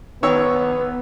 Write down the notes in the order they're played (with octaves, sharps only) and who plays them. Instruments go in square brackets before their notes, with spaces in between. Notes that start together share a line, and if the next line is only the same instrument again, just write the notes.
[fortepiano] D#3 C#5 E6 [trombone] B3